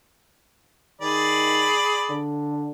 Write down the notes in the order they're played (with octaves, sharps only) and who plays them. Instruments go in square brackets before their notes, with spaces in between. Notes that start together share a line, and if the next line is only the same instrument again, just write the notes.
[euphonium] D#3 [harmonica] G#4 D5 B5
[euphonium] D3